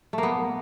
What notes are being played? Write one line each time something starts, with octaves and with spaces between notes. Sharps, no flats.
A3
A#3
B3